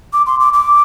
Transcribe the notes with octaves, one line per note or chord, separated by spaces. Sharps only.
D6
C6
D6
D6